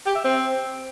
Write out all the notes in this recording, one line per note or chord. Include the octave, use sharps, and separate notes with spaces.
G4
E5
C4